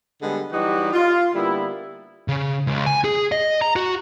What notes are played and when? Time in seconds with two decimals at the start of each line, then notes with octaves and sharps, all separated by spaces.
0.22 D3 G3 G#3 B3
0.52 E3 F#3 G3 D#4 F#4 G4
0.93 F4
1.35 D3 G3 A#3 B3 E4
2.28 C#3
2.67 C#2
2.86 G#5
3.04 G#4
3.32 D#5
3.62 A#5
3.76 F#4